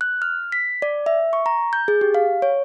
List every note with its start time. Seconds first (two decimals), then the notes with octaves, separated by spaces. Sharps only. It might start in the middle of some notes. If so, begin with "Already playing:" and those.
0.01 F#6
0.22 F6
0.52 B6
0.82 D5
1.06 E5
1.33 C#6
1.46 A#5
1.73 G6
1.88 G#4
2.01 G4
2.15 F5
2.42 C#5